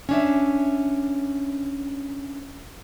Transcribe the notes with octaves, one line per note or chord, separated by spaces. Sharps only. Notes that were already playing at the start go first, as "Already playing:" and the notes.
C#4 D4 E5